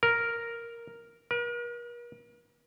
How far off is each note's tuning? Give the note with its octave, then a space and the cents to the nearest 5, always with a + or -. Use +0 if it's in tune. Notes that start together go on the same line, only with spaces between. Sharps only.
A#4 +0
A#4 +45